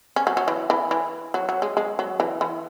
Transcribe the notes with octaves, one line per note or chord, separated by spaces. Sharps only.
C#4
F#3
F#3
E3
E3
E3
F#3
F#3
G#3
G#3
F#3
E3
E3